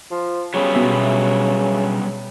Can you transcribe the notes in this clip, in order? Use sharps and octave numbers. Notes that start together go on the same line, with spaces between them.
F3
C#3 F#3 G3 B3
B2 E5